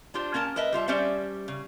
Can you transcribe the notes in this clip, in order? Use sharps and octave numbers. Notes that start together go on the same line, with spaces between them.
D4 F4 G4 C5
A#3 C#4 A#4 A5
A#4 B4 D#5 E5
G3 F4 E5 A5
G3 C#4 C5 D5 E5
C#3